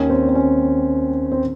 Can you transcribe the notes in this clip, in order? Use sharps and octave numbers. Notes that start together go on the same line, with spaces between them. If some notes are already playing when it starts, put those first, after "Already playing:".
Already playing: D#2 D#3 C#4
C4
C4
C#4
C4